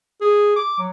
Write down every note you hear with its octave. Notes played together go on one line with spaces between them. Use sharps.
G#4
D6
F#3